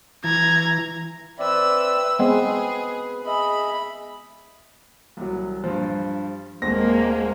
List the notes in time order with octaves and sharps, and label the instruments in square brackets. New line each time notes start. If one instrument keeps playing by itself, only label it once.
[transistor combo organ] E3 [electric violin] A#5 G#6
[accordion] C4 D5 E5 [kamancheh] B4 E6
[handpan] G#3 B3 C4 [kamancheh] G#4 [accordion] B4
[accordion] G#4 D#5 E5 [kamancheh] B5
[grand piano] C2 F#3
G2 F3
[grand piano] D#1 C4 A#6 [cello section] G#3 A#3